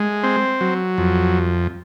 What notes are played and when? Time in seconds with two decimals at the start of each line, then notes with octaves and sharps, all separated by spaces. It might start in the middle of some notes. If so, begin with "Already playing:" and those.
Already playing: G#3
0.23 C4
0.61 F#3
0.98 F2